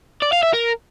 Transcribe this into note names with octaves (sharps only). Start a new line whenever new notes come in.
D5
F5
E5
A#4